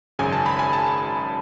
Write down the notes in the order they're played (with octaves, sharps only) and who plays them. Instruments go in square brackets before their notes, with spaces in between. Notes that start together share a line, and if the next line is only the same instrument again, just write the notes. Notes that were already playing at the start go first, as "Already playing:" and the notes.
[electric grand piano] G#1 F#2 C#3 G#5
A5
B5
G#5
A5